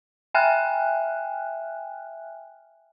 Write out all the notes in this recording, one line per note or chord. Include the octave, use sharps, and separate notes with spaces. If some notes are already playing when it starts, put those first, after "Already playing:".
E5 G5 G#5 F6 F#6